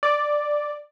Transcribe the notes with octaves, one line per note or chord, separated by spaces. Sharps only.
D5